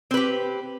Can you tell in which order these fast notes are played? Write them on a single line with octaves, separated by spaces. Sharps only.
C4 B4 G4